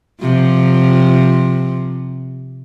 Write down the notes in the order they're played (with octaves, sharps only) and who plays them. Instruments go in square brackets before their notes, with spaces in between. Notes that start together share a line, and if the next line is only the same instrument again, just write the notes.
[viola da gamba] C3 F3